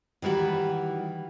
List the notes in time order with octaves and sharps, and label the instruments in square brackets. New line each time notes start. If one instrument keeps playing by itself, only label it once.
[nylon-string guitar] D#3 E3 G3 F#4